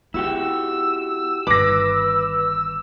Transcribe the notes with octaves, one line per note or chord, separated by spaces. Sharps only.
B3 E4 F#4 G4 E6
G1 D#3 B4 D6 A#6